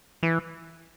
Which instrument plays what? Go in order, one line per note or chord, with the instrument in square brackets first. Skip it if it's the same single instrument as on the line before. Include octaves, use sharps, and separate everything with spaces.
[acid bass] E3